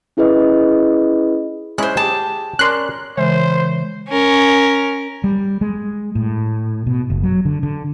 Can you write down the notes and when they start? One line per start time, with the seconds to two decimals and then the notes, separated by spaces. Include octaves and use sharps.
0.17 C#4 E4 G#4 B4 D#5
1.78 G#3 C#4 E4 C5 F#6
1.97 G4 G#4 A5
2.59 C#4 A#4 D5 C6 F#6
3.17 C#3 E3 G#3 C5
4.08 C#4 A#4
5.24 G3
5.61 G#3
6.15 A2
6.87 B2
7.10 F#1
7.23 F#3
7.45 D3
7.63 D3